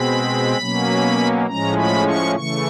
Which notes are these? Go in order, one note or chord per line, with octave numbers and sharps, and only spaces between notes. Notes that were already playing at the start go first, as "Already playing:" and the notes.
Already playing: B2 G#3 C4 B5
B2 F#3 A#3 C#4
A2 F3 G#3 C#4 A#5
B5
C#6
C#3 E3 A3 C#6